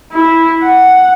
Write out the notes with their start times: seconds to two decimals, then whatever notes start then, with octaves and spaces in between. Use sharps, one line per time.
0.12 E4
0.63 F#5